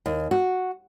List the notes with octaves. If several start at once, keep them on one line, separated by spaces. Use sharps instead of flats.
D#2
F#4